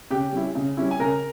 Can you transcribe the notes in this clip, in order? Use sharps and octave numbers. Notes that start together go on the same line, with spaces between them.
C#3 G4 G5
G3 C#4 E4
C#3
G3 C#4 E4
G#5
C#3 A#4 A#5